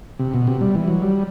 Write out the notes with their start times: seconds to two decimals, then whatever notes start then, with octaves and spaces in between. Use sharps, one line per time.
0.19 C3
0.34 B2
0.47 C3
0.61 G3
0.75 E3
0.88 F#3
1.02 G3